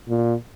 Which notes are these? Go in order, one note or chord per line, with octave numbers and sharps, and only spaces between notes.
A#2